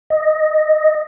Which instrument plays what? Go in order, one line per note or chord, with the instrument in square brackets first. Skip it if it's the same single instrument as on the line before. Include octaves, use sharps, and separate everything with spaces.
[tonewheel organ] D#5